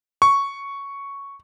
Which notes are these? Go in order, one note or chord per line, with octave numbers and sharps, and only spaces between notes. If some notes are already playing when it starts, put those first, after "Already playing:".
C#6